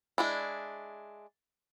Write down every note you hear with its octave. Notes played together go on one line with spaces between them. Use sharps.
G#3 D4 E4